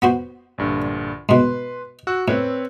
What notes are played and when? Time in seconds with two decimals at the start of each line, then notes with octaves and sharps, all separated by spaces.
0.02 B3 F#4 C5
0.58 A#1 G2 D3
1.29 G#2 B2 B4 C6
2.07 F#4 E6 F#6
2.28 A2 C4 B4 C#5